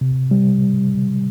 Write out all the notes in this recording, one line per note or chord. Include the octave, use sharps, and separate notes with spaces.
C3
G3